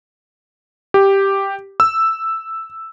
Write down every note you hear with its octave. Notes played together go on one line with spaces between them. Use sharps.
G4
E6